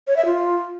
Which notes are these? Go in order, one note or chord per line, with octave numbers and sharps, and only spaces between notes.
C#5
E5
F4